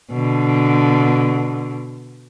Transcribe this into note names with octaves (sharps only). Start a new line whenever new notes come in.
B2 D3